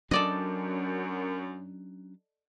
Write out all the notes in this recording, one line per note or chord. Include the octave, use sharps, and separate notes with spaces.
F#2 F#3 C#4 D4 A4 D5 D#5